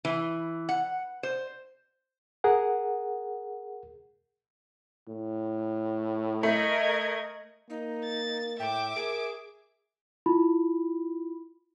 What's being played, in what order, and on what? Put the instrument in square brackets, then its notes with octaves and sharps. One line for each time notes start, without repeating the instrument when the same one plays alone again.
[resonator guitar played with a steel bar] E3
F#5
C5
[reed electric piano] G#4 A#4 F#5
[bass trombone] A2
[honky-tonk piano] A3 [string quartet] A#4 D#5 G#6
[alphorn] A#3 [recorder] D#4
[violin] A6
[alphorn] A2 [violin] E5 D6 [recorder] G5
[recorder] G#4 [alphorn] A#4
[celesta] E4 F4 B5